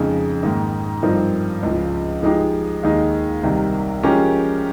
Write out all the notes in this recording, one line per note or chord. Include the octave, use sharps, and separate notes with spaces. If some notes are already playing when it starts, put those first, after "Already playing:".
Already playing: F2 C#3 G#3 D#4
G#2 D#3 A#3 D#4
G2 F3 C4 D#4 A#4
C#2 C#3 F3
F3 G#3 D#4 G4
D#2 D#3 G#3 D#4
C2 C3 D#3
F3 G#3 C#4 G4 A#4